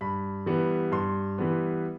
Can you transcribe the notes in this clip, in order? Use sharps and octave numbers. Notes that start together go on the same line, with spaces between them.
G2 B5
E3 G3 B3
G2 C6
E3 G3 B3